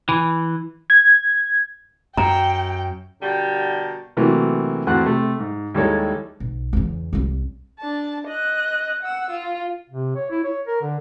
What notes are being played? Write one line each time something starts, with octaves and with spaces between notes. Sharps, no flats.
E3
G#6
F#2 G5 A#5
B2 D3 G3 G4 A#4 A5
C3 E3 F#3 A3 A#3
E2 A3 C4 F#4 F#5 F#6
C3 A3
G#2
D#2 G3 G#3 E4 A4 C#5
B1
E2 C#3
C2 C#4
D4 A5
D#5 F#6
F#5 E6
F4
C3
C#5
E4
C#5
A#4
D3